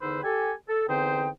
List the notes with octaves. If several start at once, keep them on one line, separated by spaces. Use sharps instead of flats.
E2 D3 D#4 B4 C5 E6
G4 A4 G#5
A4
E2 D3 C4 D#4 C5 G5